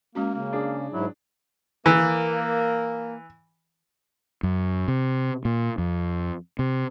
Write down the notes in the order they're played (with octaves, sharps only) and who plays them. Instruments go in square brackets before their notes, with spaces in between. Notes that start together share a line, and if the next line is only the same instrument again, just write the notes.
[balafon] G#3 C#4 F#4 [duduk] A#3
[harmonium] C#3 [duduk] A#3
[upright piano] D4 G#4
[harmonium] G#2 E4 [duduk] F#3
[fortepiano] E3 [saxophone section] A#3
[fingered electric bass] F#2
C3
A#2
F2
C3